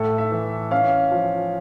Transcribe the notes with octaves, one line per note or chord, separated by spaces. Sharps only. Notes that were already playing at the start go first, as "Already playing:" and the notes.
Already playing: A2 A4
E5
E3
C#4 F5
F3